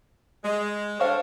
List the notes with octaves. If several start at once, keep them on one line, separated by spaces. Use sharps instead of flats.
G#3
D4 A4 C5 C#5 F5